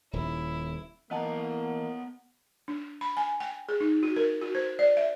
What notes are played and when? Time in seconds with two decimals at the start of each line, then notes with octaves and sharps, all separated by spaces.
0.13 D#1 E4
1.11 E3 A#3 B3 D#5 F#5 A5 A#5
2.68 D4
3.01 B5
3.17 G#5
3.40 G5
3.69 G#4
3.80 D#4
4.03 F#4
4.16 A#4
4.41 F#4
4.55 C5
4.79 D5
4.97 E5